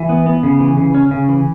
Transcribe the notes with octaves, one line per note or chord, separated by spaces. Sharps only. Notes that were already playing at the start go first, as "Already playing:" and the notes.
Already playing: E3
B3
B3
C#3
E3
C#3
C#4
C#3
E3